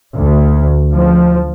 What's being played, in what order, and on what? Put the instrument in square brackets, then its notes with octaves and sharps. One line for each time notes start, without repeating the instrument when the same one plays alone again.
[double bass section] D2
F3